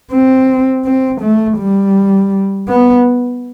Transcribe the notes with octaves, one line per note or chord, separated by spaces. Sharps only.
C4
C4
A3
G3
B3